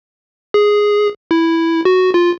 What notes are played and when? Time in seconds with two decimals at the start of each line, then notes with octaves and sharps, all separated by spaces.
0.54 G#4
1.31 E4
1.85 F#4
2.14 F4